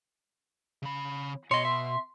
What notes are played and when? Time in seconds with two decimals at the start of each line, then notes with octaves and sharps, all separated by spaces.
0.83 C#3 B5
1.51 B2 C#5 D#5 C6
1.65 E5